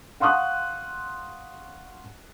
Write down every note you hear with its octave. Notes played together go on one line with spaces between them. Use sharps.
F5 F#5 C6 C#6 D#6 F#6